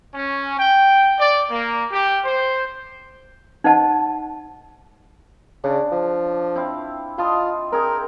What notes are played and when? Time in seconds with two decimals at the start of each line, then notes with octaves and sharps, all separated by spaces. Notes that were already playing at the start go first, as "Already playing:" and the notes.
0.13 C#4
0.57 G5
1.18 D5
1.50 A#3
1.91 G4
2.24 C5
3.64 D#4 C5 D#5 F#5 A5
5.64 C#3 D4
5.92 F3
6.56 C4 E4 F5
7.18 F4 D#5 A5 C6
7.72 C4 G#4 A#4 G5